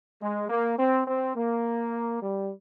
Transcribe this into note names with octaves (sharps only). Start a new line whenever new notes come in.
G#3
A#3
C4
C4
A#3
G3